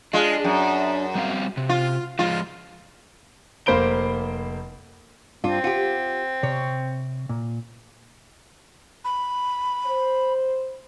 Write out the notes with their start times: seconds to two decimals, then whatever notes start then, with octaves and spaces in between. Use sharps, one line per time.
0.13 G#3 D4 F4
0.44 F#2
1.15 G3 C4 F5
1.57 C3
1.69 F4
2.19 F3 G#3 F4
3.66 F1 A#3 C5 B5 D7 G7
5.44 G2 C4 D4 F4
5.64 F4 G4 F#5
6.43 C3 C#5
7.29 A#2
9.04 B5
9.86 C5